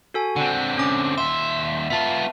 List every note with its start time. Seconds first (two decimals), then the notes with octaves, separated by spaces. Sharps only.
0.14 F#4 A4 G#5
0.36 D3 C4 F#5
0.78 C#4 D6
1.18 D#2 E5 C6
1.90 B3 F4 E5 A5